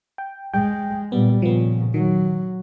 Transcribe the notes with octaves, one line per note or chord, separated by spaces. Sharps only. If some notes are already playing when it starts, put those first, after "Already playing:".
G5
G#3 G5
A#2 G3 B3
A#2 C#3 F3 B3
D#3 F#3